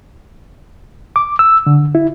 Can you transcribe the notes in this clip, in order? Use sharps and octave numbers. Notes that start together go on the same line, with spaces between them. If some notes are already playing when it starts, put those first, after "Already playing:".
D6
E6
D3
E4